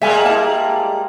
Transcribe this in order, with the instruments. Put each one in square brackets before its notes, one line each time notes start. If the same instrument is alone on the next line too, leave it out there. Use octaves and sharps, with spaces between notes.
[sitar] G3 G#3 A#3 [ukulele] E5 G#5
[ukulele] E4 A5